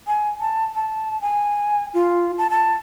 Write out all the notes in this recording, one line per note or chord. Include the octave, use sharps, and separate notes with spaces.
G#5
A5
A5
G#5
F4
A5
A5